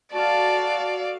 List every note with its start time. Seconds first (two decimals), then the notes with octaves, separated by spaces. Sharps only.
0.14 F#4 A4 D5 F5 A5